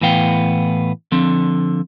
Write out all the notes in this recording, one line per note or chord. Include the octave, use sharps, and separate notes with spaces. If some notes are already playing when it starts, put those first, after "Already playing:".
A2 E3 B3 F5 G5
D3 F3 C4